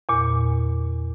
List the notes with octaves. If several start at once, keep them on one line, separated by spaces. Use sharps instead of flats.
E2 A#2